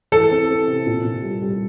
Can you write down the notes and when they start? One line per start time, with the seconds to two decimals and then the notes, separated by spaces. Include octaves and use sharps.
0.12 E3 A4
0.31 C4
0.49 C4
0.68 C3
0.86 A#2
1.05 A#2
1.23 G3
1.42 G3